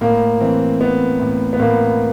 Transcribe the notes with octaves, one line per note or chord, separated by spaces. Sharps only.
A2 A#3
E3 C4
E3 B3
A2
B3
A2 A#3